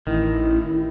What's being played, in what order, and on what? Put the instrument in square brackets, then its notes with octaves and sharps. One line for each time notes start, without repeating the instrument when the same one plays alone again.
[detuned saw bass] A1 [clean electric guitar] D#3 [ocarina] E4